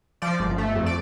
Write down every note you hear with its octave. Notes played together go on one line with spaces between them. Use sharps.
F3 D5
G1
A3
F2
D5